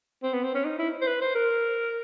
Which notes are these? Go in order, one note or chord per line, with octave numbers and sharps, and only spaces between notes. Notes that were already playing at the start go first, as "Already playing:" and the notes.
C4
B3
C4
C#4
D#4
E4
C5
B4
C5
A#4